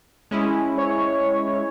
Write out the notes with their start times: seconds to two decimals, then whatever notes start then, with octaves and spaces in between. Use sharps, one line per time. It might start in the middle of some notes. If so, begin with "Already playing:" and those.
0.31 G#3 C#4 E4
0.78 C#5